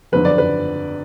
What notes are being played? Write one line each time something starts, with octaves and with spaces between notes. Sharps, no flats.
F#1 F2 D3 B4
D5
B4